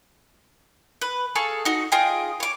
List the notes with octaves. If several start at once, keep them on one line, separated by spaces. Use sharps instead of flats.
B4
G#4 A4 F5 C#6
D#4 F#4
F4 G#4 D#5 G5
C#5 D6